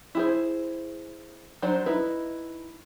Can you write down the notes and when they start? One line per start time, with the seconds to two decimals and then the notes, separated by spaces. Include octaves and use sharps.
0.15 E4 G#4 C5
1.62 F#3 D4 D#4 C5
1.86 D#4 E4 B4